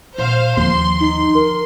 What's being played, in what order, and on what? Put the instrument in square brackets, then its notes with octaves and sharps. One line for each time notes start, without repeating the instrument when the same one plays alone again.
[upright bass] A#2 [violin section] C5 F5
[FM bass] D#2 [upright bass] D3 F3 [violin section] C6
[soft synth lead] D#4 [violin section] C6
[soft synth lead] A#4